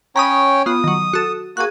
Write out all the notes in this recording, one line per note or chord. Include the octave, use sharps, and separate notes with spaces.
C#4 C#5 G5 A#5 B5 D#6
B3 F4 D#6
D#3 F#3
F#4 A4
A#3 F#4 G#4 F#6